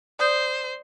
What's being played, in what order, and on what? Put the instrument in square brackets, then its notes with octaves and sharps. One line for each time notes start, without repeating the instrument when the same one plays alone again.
[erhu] C5 [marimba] D5 D#6 G6